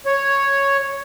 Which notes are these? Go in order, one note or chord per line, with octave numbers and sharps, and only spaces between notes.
C#5